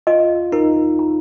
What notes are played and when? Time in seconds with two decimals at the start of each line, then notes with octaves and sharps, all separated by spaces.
0.07 F4 D#5
0.52 D#4 A#4
0.99 A#5